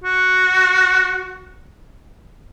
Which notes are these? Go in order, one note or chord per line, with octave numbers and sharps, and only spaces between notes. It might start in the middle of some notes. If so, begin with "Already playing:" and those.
F#4